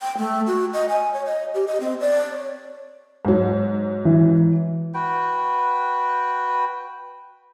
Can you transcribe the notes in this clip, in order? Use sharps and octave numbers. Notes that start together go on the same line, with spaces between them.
G5
A3
F#4
D#5
G#5
C#5
D#5
G4
D#5
C4
D5
C#5
G#2 F#3
E3
F#4 B4 G5